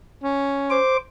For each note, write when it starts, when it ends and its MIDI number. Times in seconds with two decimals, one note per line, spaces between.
0.23 0.78 61
0.70 0.97 72
0.70 0.97 86